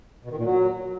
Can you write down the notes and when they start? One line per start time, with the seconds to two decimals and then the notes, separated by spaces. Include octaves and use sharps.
0.25 B2
0.31 D#3
0.37 A#2
0.44 F#3